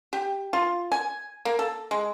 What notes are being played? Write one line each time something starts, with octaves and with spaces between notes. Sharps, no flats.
G4
F4
G#5
A#3
A4
G#3